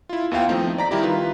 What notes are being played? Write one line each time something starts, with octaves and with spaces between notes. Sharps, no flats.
E4 F4
D#2 B3 E4 F4 F5 G5
F3 A3 C4 D#4
D5 A#5 B6
D#3 G3 E4 G4
F4 B4